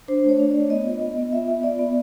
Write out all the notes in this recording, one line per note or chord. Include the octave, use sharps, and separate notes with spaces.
D4 C5
A3
C#5
D4
A3 D5
B3 D#5
F4
B3
B3
F4 E5
B3
F4 D5
B3